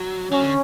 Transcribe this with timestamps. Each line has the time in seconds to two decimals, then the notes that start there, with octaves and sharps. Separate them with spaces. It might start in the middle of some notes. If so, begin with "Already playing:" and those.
Already playing: F#3
0.31 F#3 C#4
0.41 D3